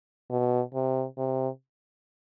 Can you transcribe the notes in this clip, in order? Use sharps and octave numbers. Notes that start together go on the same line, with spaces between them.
B2
C3
C3